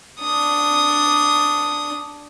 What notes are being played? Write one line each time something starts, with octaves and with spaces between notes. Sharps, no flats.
D4 D#6